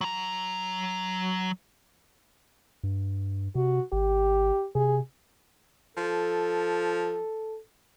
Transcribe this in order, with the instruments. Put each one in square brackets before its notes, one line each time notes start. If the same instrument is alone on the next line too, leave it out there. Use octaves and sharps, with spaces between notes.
[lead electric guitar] F#3 A#5
[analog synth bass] G2
[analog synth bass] C3 [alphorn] F#4
[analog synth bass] G#1 [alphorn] G4
[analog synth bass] C3 [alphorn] G#4
[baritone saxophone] F3 [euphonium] A4